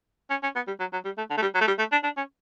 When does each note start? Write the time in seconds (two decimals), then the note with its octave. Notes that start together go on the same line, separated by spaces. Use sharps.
0.31 C#4
0.43 C#4
0.56 B3
0.68 G3
0.80 F#3
0.93 F#3
1.05 G3
1.18 A3
1.30 D3
1.38 A3
1.42 G3
1.55 F#3
1.61 A3
1.68 G3
1.79 A3
1.92 D4
2.04 D4
2.17 C#4